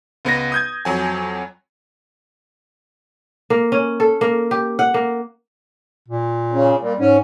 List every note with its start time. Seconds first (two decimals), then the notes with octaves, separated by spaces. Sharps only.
0.25 C#2 B3 B4 A#6
0.52 D#6 G6 G#6
0.85 F2 F#3 G#5
3.50 A#3
3.72 C#4
4.00 A4
4.21 A#3
4.51 G4
4.79 F#5
4.94 A#3
6.08 A#2
6.52 C#3
6.80 A#2 G3
6.99 G#2 C#4